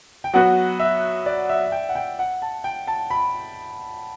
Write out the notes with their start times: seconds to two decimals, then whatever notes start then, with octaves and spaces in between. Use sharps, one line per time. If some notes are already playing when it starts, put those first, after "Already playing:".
0.24 G5
0.33 F#3 B3 F#4 F#5
0.79 E5
1.26 D5
1.49 E5
1.72 G5
1.89 F#5
1.95 G5
2.19 F#5
2.42 A5
2.64 G5
2.87 A5
3.10 B5